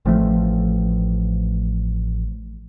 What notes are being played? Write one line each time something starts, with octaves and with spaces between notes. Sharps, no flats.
A1 F3 A3